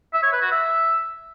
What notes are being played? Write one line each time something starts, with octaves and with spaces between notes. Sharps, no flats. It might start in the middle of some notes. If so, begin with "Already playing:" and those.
E5
C#5
B4
F#4
E5